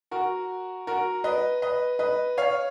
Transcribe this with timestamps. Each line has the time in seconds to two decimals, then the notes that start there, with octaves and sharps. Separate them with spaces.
0.11 F#4 A#4
0.87 F#4 A#4
1.24 B4 D#5
1.62 B4 D#5
1.99 B4 D#5
2.38 C#5 F5